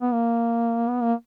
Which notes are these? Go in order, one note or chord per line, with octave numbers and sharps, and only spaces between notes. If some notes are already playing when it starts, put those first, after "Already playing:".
B3
A#3
B3
A#3